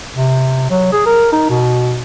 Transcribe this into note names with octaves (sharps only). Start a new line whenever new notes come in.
C3
F#3
G#4
A#4
D#4
B2